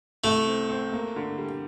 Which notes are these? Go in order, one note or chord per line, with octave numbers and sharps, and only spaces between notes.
C2 A3
C4
C4
A#3
D3
G3